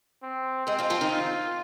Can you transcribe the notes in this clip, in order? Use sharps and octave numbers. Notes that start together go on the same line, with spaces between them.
C4
G#3 C4 G#4
F3 F4
F3 F4
D#3 D#4
F4